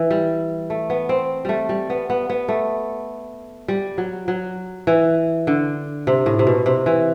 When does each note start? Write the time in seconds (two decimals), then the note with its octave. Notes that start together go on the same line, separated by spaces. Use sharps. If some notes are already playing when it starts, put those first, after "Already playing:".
Already playing: E3
0.11 G3
0.70 A3
0.90 B3
1.09 C4
1.45 G3 A3
1.69 G3
1.90 B3
2.10 B3
2.30 B3
2.48 A3
3.68 G3
3.98 F#3
4.28 F#3
4.87 E3
5.47 D3
6.07 C3
6.26 A2
6.39 C3
6.47 B2
6.66 C3
6.86 E3